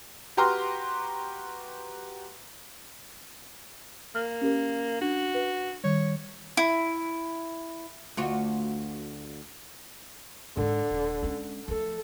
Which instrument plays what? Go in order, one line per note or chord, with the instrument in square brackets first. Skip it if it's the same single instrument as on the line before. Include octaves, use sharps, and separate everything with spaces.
[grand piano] F#4 G4 B4 A#5 C6 F6
[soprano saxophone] A#3 [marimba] F6
[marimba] C#4 G4 A#4
[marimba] D4 [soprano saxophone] F#4
[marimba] B4
[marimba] D#3 G3 [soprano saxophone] C#5
[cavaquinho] E4
[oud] D2 F4 F#4
[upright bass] G#2 G#3 [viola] D3
[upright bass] D#1
G#3 C#4
[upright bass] F3 A3 [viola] A4